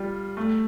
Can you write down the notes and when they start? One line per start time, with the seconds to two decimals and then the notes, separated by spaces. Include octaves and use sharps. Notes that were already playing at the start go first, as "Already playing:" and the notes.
Already playing: G3 F4
0.37 A3